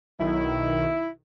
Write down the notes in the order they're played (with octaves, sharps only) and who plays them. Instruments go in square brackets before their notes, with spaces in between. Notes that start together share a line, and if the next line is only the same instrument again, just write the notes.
[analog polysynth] B1 D#3 [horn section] E4